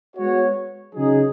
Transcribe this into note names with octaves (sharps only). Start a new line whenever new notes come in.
G#3 B3 F#4 C#5
C#3 F#3 D#4 G#4